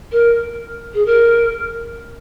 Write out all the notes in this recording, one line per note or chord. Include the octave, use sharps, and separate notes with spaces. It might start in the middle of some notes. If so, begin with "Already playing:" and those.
A#4
G#4
A#4